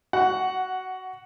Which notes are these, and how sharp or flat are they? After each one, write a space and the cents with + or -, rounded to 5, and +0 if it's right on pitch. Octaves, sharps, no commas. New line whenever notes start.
F#4 +15 F#5 +0